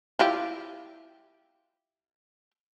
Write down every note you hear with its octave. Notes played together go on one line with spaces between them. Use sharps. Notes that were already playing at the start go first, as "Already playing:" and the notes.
E4 F4 G4